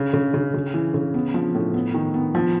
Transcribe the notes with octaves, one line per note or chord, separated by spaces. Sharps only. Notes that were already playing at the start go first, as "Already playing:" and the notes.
Already playing: C#3
C#3
C#3
C#3
E3
C#3
B3
F3
A2
B3
D#3
B3
F3